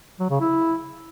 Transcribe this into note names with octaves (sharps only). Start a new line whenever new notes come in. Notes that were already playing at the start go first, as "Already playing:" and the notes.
F#3
C#3
E4